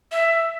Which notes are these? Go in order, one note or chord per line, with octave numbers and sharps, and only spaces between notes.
E5